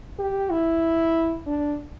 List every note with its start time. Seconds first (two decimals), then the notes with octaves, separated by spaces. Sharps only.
0.19 G4
0.50 E4
1.47 D4